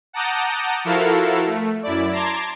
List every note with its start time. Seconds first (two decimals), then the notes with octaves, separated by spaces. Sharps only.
0.13 F#5 A5 A#5 D6 D#6 G6
0.84 F3 E4 F#4 A4 A#4 F5
1.46 A3
1.83 F#2 E4 D5
2.11 A5 A#5 C6 D6 G#6